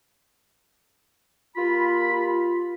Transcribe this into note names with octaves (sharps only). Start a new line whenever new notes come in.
A#3 F4 G4 B5
F4